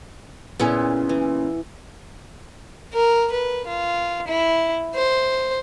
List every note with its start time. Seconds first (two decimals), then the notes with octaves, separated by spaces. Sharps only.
0.60 A#2 C#3 B3 C#4 E4
1.09 E3
2.93 A#4
3.32 B4
3.67 F4
4.27 E4
4.95 C5